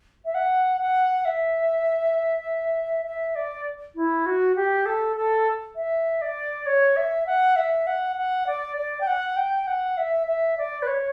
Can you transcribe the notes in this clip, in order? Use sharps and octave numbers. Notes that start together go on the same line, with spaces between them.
E5
F#5
F#5
E5
E5
D5
E4
F#4
G4
A4
A4
E5
D5
C#5
E5
F#5
E5
F#5
F#5
D5
D5
G5
F#5
G5
F#5
E5
E5
D5
B4
C#5